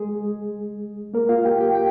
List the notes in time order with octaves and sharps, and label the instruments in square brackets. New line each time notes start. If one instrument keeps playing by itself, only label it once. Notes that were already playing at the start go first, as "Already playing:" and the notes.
Already playing: [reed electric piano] G#3 G#4
A#3 A#4
F4 F5
G4 G5
G4 G5
G5